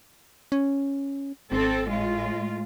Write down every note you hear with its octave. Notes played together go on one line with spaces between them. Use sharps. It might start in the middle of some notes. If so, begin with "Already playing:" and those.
C#4
G#1 C4 A4
A2 G#3 F4